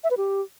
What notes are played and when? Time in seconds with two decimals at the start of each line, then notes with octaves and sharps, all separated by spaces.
0.04 E5
0.11 B4
0.17 G4